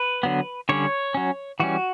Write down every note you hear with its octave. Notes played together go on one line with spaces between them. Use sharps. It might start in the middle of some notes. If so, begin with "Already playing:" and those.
Already playing: B4
D3 F#3 B3
D3 G3 C#4 C#5
F#3 C#4
E3 G3 C#4 F#4